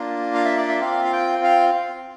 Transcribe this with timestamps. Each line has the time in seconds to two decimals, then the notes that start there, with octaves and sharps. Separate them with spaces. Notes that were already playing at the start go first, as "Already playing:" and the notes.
Already playing: A#3 D4 F4
0.34 F5
0.45 E5
0.57 D5
0.68 E5
0.81 C4 F4 F5
1.05 F5
1.13 G5
1.44 F5